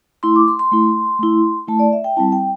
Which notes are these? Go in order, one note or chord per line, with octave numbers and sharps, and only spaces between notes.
A3 E4 C6
D6
C6
C6
A3 E4
A3 E4
A3 E4 A5
D5
E5
G5
G3 C4 E4 A5
G5